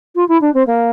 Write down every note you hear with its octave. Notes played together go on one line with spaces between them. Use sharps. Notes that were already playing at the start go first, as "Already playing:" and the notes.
F4
E4
D4
C4
A#3